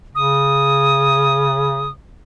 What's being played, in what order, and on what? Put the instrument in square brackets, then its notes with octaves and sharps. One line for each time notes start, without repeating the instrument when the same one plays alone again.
[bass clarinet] C#3 [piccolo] D#6